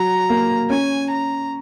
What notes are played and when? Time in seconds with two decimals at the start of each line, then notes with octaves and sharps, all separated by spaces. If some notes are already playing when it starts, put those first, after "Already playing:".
Already playing: F#3 A#5
0.29 A#3
0.70 C#4 G#5
1.10 A#5